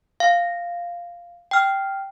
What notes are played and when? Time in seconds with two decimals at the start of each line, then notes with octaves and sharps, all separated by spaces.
0.20 F5
1.51 G5 F6